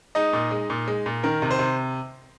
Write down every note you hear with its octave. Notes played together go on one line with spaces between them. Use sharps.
G#3 D#4 D#5
A#2
G#3
A#2
G#3
A#2
D#3 A#4
C3
C5
C3